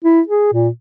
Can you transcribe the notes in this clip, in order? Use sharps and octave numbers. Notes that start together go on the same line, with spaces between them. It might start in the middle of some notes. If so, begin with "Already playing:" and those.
E4
G#4
A#2